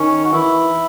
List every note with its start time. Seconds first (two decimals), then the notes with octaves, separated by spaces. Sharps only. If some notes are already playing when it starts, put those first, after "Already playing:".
Already playing: D#3 C#4
0.24 F#4
0.33 E3 E4